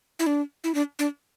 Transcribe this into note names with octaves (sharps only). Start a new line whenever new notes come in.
E4
D4
E4
D4
D4